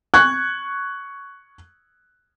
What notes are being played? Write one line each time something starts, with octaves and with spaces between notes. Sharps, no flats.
C#6 F#6 G#6